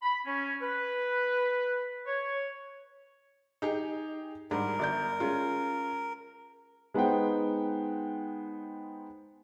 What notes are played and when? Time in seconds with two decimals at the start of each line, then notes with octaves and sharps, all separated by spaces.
0.02 B5
0.26 C#4
0.62 B4
2.06 C#5
3.62 D#4 G4 G#4
4.51 G#2 G3 D4 A#4
4.79 G1 D5 G6
5.20 G#3 C#4 F4
6.94 G#3 B3 D#4 C5 F#5 G5